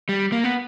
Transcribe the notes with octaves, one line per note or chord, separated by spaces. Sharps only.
G3
A#3
B3